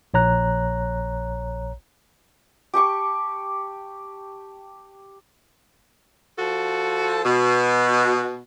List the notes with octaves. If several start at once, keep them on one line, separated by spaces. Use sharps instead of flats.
A#1 C#5 A#5 F#6
G4 A5 C#6 D6
F3 F#4 A4
B2